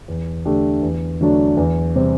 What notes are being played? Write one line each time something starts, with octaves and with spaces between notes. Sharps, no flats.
E2
D3 A3 D4 G4
E2
D3 F#3 A3 D4
E2
C3 G3 C4